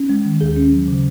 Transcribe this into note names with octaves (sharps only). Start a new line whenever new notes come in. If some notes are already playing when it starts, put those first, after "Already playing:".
Already playing: C#4
G#3
D#3
D#2 G#4
C#4
F#3
C#3